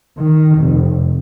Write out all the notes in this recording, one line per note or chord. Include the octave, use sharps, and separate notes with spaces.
D#3
F1